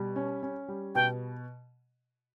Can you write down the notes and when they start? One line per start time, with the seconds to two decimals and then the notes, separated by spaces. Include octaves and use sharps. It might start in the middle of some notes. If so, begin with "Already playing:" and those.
Already playing: B2 G3
0.16 C#4
0.43 C#4
0.68 G3
0.95 B2 G5